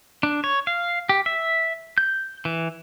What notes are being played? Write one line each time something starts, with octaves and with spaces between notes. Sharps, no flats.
D4
C#5
F5
G4
E5
G6
E3